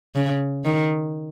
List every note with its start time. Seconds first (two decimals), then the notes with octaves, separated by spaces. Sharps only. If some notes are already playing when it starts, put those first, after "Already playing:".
0.15 C#3
0.65 D#3